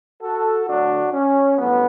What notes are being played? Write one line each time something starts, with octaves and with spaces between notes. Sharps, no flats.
F#4 A4
D2 D3 F#3 A3 D4 F#4
C#4
A1 G2 D3 F#3 B3